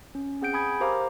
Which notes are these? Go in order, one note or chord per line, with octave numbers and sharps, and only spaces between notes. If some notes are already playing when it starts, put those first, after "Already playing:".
C#4
C4 G#4 F#5 G6 D7
G#5 B5 D#6 G#6
G4 A#4 C5 F5 A#5 D6